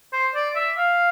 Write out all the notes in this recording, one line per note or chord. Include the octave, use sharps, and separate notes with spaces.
C5
D5
E5
F5